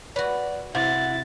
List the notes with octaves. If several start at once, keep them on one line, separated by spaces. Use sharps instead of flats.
F#4 B4 D5
C3 E4 F#5 A6